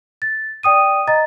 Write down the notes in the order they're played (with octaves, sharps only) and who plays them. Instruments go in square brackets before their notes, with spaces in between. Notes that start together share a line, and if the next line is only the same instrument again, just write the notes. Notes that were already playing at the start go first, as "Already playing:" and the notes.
[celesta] A6
D5 G5 D#6 D#7
D#5 A#5 A6